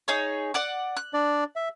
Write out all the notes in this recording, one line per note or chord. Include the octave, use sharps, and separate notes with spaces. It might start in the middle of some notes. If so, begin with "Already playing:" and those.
D#4 G#4 C#5
D5 F#5 D6
F#6
D4 D5
E5